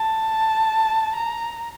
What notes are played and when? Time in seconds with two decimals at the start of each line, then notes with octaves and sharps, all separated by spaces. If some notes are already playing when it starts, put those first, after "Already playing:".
Already playing: A5
1.15 A#5